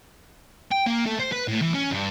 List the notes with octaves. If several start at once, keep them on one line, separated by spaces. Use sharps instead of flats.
G5
A#3
A3
C5
B4
A2
E3
C#4
G2